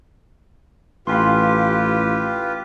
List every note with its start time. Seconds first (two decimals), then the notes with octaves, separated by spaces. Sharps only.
1.07 A1 F4 G4 B4 F5 G#5 C6